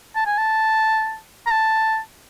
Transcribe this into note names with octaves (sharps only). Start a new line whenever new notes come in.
A5
G#5
A5
A#5
A5